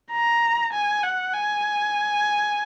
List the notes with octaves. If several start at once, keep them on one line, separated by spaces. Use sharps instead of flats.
A#5
G#5
F#5
G#5